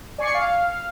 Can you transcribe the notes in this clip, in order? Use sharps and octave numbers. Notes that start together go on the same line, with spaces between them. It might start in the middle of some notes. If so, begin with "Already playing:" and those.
D5 G#5 C#6 C7 C#7
F5